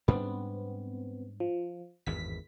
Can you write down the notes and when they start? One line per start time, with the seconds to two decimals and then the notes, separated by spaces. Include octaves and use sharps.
0.08 G#2 G3 B3 C4 D4
1.40 F3
2.06 G#1 E2 G2 B6